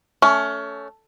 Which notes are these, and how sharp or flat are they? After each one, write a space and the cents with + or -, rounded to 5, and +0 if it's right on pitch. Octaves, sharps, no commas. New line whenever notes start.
A3 +0 C#4 +20